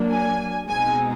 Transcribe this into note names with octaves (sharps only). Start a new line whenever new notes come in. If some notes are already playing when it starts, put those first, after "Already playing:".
Already playing: F#3 A#3 D4
G#5
B2 G#3 C4 D#4 G#5